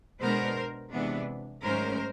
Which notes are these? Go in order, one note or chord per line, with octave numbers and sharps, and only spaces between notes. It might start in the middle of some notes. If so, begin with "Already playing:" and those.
B2 G#3 B3 D4 A#4 C5
C3 E3 G#3 B3 D4
G#2 D#3 F#3 A3 C#4 A#4 C5